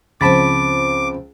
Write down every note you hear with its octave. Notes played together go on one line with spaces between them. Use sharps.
C#2 C#3 F3 C4 A5 B5 D6 A6